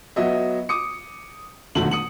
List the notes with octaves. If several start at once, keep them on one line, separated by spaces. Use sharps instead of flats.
F#3 B3 D#5 E5
D6 D#6 C#7
E1 D3 D#3 F#3 A3 F#7
D#6 C#7 F#7